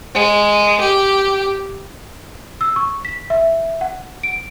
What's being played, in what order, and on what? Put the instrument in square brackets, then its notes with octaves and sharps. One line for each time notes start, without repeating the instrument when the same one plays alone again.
[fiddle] G#3
G4
[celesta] E6
C#6
B6
E5
F#5
D7